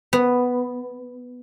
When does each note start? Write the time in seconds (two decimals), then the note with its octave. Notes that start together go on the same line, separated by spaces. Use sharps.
0.13 B3